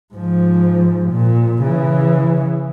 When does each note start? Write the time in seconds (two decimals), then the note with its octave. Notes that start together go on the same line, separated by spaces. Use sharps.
0.14 G#2 F3
1.11 A#2
1.63 C#3 E3